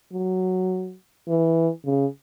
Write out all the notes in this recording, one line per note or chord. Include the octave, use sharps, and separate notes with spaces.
F#3
E3
C#3